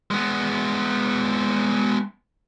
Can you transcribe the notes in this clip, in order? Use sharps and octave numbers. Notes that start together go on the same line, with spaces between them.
G#3 B3